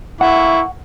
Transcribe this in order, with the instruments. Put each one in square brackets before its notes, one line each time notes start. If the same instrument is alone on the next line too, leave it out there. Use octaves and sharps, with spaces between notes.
[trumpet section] A3 A#3 C#6 [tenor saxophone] E4 [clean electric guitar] F#5